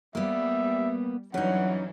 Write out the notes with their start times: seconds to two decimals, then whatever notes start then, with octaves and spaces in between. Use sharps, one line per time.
0.15 G3 A#3 B3 E5
1.34 G2 E3 F#3 C#4 D#4 F#5